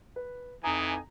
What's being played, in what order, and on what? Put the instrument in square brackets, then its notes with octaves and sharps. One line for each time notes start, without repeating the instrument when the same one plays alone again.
[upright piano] B4
[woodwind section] F2 D#4 G#5 [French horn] E3 [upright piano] A#5 [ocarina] D#6